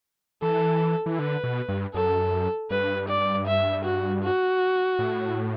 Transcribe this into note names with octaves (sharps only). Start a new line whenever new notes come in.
E3 A4
E3
D3 B4
B2
G2
F#2 A4
G2 B4
D5
E5
F#4
F#4
A2